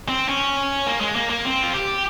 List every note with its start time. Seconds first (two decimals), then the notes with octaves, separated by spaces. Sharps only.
0.09 C4
0.29 C#4
0.86 A#3
1.01 G#3
1.16 A#3
1.30 A#3
1.45 C4
1.63 F4
1.74 G4